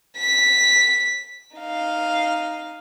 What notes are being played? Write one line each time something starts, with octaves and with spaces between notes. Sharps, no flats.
B6
D#4 F5